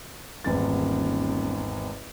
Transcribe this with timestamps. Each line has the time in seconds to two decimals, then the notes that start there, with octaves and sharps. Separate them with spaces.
0.44 D#1 G#1 E2 A6